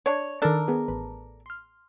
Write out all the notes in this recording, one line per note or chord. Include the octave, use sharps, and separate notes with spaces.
D4 C#5
D#3 D4 A4 A#4 D5
B3 G#4 B4
A1 B4
C6 F6